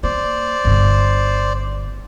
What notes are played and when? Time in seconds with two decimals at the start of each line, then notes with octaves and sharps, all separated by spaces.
0.03 A#3 C5 D5
0.65 G1 D3